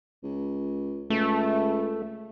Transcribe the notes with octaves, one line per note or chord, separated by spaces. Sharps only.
C#2
C#2 A3